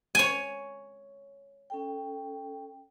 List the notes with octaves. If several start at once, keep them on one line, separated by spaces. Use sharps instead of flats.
C#5 G#5
C#4 A4 G5